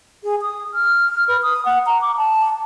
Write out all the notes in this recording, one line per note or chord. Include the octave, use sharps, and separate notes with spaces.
G#4
D#6
F6
B4
D#6
F#5
A#5
D6
A5